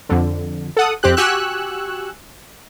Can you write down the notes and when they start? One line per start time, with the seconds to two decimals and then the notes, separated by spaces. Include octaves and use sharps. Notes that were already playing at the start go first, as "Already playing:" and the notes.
0.09 F2 D3
0.77 A4 F#5 D#6
1.03 F2 C4 G4 F#6
1.17 F#4 G4 G#5 C#6 E6 F#6